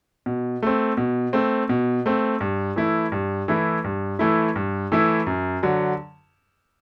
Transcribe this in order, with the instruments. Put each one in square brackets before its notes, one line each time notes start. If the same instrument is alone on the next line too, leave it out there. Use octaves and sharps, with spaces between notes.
[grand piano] B2
A3 C4
B2
A3 C4
B2
A3 C4
G2
E3 A3 E4
G2
E3 A3 E4
G2
E3 A3 E4
G2
E3 A3 E4
F#2
D3 F#3